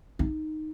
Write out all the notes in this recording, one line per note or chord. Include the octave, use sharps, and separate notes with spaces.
D#4